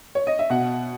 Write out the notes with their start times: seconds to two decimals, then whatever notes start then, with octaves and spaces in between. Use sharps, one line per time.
0.15 C#5
0.27 D#5
0.39 E5
0.50 B2 F#5